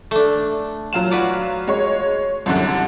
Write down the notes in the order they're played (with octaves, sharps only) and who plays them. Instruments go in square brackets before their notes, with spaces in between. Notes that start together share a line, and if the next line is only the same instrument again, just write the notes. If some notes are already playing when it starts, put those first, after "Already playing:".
[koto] A3 D4
[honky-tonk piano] F#3 F4 E7
[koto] F#4 B4 D5
[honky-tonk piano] G#3 C#5
C2 F#2 D3